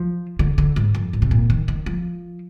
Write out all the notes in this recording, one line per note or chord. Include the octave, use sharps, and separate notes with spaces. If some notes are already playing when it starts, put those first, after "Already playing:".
Already playing: F3
D3
D3
G#2
F2
G#2
C3
A#2
D#3
D#3
F3